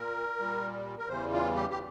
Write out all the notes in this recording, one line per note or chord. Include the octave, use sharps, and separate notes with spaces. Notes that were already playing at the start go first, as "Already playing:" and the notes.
Already playing: A#2 A#4
A#2 G3
A#4
E2 C#3 E3 G3 C5
F4
G4
G4